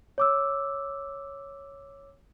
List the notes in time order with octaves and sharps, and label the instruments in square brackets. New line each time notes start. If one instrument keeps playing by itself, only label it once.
[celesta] C#5 D6 E6